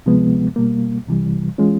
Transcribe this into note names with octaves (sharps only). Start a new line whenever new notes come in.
D2 C3 F3 G#3 B3
B2 G3 A#3
C2 C3 E3 G3
E3 G#3 C#4 F4